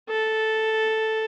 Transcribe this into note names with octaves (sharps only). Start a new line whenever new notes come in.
A4